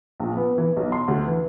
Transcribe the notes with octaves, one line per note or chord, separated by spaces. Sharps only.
A#1
B3
E3
B1
C6
D2
E3